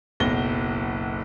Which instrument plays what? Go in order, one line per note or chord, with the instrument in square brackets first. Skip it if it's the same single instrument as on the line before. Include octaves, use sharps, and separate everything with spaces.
[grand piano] F#1 B1 A#6 G7